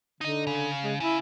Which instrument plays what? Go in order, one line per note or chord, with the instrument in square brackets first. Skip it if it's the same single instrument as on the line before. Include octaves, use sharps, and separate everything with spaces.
[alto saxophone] D3 [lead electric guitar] D#4 D#5
[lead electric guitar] C#3
[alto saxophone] G#3
[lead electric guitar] C#3 [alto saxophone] E4